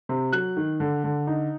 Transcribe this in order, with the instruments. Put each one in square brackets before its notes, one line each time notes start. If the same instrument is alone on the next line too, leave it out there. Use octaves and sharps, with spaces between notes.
[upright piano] C3
F#3 F#6
D#3
D3
D3
D#4